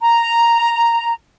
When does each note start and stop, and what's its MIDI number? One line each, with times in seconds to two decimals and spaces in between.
0.01 1.12 82